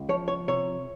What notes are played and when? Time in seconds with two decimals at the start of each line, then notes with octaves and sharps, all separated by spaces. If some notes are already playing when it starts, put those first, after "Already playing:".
Already playing: C#2
0.09 F3 C#5
0.28 C#5
0.48 C3 C#5